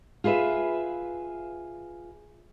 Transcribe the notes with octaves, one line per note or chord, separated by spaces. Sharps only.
F4 G#4 B4 E5